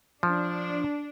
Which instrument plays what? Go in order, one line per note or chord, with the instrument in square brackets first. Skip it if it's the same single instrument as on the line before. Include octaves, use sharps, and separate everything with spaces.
[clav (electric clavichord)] F3 [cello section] D4